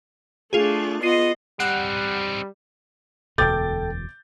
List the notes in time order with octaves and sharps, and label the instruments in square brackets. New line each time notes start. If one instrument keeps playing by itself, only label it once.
[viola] A3 D4 [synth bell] F4 G#4
[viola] B3 D#5 [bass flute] F4 [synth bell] C7 D#7
[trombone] G3 [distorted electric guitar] C4 D#4 [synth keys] F#5
[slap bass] E1 D2 B2 [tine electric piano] A4 G5 [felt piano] D6 G6 A6